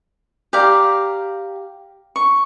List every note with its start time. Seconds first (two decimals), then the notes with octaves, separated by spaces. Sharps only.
0.53 G4 D5 F5 A#5
2.16 C#6